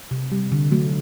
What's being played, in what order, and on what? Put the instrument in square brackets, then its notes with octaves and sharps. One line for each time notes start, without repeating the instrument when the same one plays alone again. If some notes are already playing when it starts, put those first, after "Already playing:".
[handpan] C3
G3
D3
F#3 A3